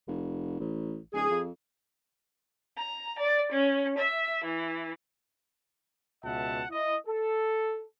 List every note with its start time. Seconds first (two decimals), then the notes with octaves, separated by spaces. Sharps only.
0.07 F1
0.60 A1
1.14 D1 G#4
1.31 F2
2.75 A#5
3.18 D5
3.51 C#4
3.97 E5
4.43 E3
6.23 C#2 B2 E5 F#5 A5
6.70 E4 D#5
7.06 A4